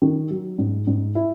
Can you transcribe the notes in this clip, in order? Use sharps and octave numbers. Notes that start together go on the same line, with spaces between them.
D#3
F#3
G#2
G#2
E4